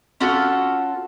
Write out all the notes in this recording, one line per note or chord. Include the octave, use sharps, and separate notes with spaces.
C#4 F4 F#4 A4